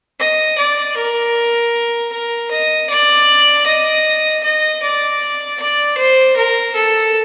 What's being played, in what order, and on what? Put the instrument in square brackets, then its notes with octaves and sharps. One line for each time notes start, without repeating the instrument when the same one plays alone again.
[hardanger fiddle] D#5
D5
A#4
A#4
D#5
D5
D#5
D#5
D5
D5
C5
A#4
A4